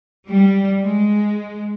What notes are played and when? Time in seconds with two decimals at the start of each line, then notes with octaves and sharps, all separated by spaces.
0.28 G3
0.83 G#3